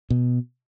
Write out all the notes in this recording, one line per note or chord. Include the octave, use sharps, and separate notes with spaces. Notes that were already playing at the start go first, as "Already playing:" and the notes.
B2